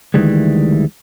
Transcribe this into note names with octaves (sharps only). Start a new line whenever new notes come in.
D2 G2 D#3 E3 G3 G#3